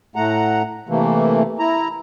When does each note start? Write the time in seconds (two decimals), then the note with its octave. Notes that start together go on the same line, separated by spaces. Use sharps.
0.16 A2 A3 F#5 A#5
0.89 C3 E3 A3 A#3
1.59 E4 A#5